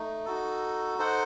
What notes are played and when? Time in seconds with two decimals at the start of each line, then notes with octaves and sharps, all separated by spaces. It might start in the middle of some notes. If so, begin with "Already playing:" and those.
Already playing: A3 D#4
0.25 D#4 F#4 A4
0.98 D#4 A4 C5 F#5